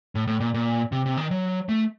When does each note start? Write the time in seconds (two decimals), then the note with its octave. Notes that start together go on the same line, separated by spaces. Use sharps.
0.15 A2
0.27 A2
0.40 A#2
0.54 A#2
0.92 C3
1.06 C3
1.17 D#3
1.31 F#3
1.69 A3